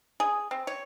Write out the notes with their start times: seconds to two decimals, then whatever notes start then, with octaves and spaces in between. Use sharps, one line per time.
0.20 G#4
0.51 C4
0.67 C#5